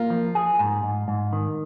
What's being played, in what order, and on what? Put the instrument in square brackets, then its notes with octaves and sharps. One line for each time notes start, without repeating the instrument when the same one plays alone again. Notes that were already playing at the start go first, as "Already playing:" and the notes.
Already playing: [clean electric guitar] A#3 [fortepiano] F4
[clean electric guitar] F3
G#4
G#2
G#2
G#2
D#3